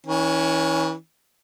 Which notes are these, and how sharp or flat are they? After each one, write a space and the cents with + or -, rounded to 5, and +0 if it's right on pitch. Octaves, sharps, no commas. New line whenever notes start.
E3 -35 C#4 +0